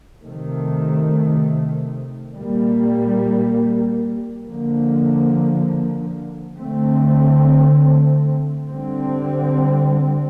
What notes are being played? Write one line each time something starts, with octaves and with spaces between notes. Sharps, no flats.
C3 D#3 A3
A#2 G3 A#3
D3 F3 A#3
D3 A3 C4
D3 G3 C4